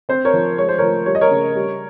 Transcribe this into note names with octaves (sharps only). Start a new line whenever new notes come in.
C4 C5
A#4 C#5
F3
G#3 C#5
C5
F3 A#4 C#5
G3 C#5
D#5
A#4 C#5
C#3
G3